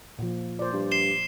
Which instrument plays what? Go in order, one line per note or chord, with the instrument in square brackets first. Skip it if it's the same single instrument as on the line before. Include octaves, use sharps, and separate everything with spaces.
[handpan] A#2 F3
[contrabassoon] A#2 [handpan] C5 D5
[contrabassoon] G2
[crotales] C7 E7 G7